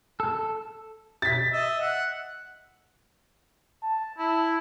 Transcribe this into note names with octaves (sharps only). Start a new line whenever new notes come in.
A4
A6 B6
D#5 E5
F#5
A5
E4